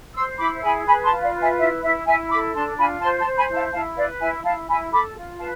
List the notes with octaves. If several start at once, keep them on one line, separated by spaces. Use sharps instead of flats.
C5 C6 E6
E4 B5 D6
G#4 G#5 B5
B4 G#5 B5
A5 C6
F4
D5 F5
B4
E5 G#5
E4 E5
E4 E5
E4 E5 G#5
A4 B5 D6
D4 A5 C6
F4 G#5 B5
C5 A5 C6
A5 C6
C5
G#5 B5
E4
F5 A5
E4 F5 A5
B4 D5 F5
E4 E5 G#5
E4 F5 A5
E4 G#5 B5
A4 B5 D6
F4
B4 F5 A5